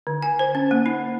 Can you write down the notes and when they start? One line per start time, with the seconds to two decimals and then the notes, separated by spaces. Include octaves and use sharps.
0.07 D3
0.23 G#5
0.39 C5
0.55 C#4
0.71 A#3
0.86 D#4